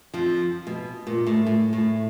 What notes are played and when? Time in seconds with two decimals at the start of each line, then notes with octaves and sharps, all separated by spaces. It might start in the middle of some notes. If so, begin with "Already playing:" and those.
0.13 F2 F3
0.67 B2
1.07 A#2
1.26 A2
1.47 A2
1.73 A2